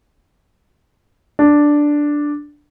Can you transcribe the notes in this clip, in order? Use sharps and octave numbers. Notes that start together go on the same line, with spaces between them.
D4